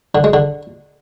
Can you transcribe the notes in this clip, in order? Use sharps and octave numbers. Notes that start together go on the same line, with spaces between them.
D3
G#3
D3